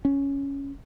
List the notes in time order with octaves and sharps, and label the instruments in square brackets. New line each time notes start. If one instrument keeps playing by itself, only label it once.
[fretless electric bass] C#4